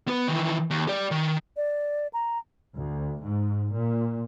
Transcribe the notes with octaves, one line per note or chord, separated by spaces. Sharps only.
B3 B4
D#3 E3
D#2
G4 D5
D#3
D5
A#5
D2
G#2
A#2